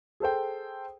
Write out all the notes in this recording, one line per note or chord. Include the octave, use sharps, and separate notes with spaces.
G#4 A4 C5 G5